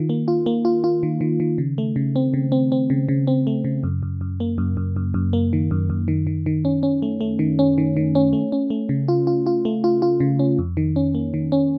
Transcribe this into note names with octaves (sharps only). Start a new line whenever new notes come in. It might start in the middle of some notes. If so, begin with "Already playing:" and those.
Already playing: D#3 F4
A#3
F4
A#3
F4
F4
D#3
D#3
D#3
C#3
A3
C#3
C4
C#3
C4
C4
C#3
C#3
C4
A3
C#3
F#2
F#2
F#2
A#3
F#2
F#2
F#2
F#2
A#3
D#3
F#2
F#2
D#3
D#3
D#3
C#4
C#4
A3
A3
D#3
C#4
D#3
D#3
C#4
A3
C#4
A3
C#3
F4
F4
F4
A3
F4
F4
C#3
C#4
F2
D#3
C#4
A#3
D#3
C#4